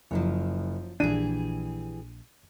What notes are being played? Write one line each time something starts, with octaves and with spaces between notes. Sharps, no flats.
F#1 F3 F#3 C#5
A#1 E3 G3 D4 G#4 D#7